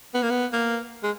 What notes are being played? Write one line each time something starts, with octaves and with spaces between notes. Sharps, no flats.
B3
A#3
B3
A#3
G#3